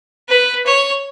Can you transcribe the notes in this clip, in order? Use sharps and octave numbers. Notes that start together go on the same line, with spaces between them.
B4
C#5